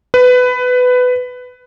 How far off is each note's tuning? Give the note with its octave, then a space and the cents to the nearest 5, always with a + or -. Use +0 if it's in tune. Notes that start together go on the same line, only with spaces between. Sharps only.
B4 +15